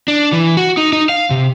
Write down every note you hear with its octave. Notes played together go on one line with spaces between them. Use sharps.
D4
E3
F#4
D#4
D#4
F5
C3